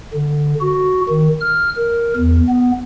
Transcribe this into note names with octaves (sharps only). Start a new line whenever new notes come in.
D3
F#4
D#3
F6
A#4
E2
B3